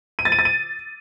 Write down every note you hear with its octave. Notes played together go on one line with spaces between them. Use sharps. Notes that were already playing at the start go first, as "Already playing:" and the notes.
D#7
A6
D#7
A6
D#7